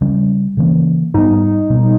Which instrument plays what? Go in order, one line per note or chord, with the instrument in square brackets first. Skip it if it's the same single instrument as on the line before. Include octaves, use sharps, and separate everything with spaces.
[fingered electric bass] C#3 G3 C#4
C#3 E3 A#3 C#4
[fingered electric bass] G#2 G3 B3 [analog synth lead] D#4
[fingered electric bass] B2 G3 B3